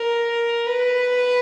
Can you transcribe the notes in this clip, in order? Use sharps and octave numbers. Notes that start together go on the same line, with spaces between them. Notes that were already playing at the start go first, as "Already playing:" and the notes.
Already playing: A#4
B4